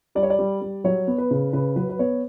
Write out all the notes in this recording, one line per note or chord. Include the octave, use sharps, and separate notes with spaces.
G3 D5
C#5
D5
G3
G3
F#3 C#5
B3
B4
C#3
C#3 B4
F#3 B4
B4
B3 C#5